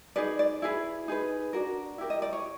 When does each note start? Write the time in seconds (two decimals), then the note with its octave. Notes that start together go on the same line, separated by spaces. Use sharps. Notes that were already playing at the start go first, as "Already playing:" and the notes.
0.16 D#4 G#4 B4 D5
0.39 D5
0.62 E4 G#4 B4
1.08 D#4 G#4 B4
1.53 D4 F#4 A#4
1.98 E4 G4 A#4
2.10 D#5
2.22 D5
2.33 C#5